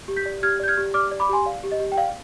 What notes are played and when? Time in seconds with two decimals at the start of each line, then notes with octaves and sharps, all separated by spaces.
0.08 G4
0.16 G6 B6
0.26 D5
0.43 G4 F6 G#6
0.60 D5 G6
0.68 F6 G#6
0.77 G4
0.94 D5 D6 F6
1.11 D5
1.20 B5 D6
1.29 G4 G#5 C6
1.46 D5 F5
1.64 G4
1.72 D#5
1.80 G4
1.92 G5
1.97 D5 F5